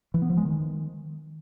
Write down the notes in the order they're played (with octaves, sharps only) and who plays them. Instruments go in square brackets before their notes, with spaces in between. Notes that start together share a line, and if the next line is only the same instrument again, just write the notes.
[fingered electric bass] E3
B3
F3
G#3
D#3